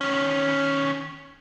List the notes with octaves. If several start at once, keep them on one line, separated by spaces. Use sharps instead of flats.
D#3 C#4